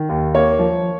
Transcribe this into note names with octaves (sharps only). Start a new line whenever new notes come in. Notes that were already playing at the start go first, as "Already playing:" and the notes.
Already playing: D#3
D#2
A#3 C#5
F3